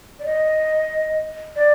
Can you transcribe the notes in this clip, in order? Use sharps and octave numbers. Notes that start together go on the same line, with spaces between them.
D5
D#5
D5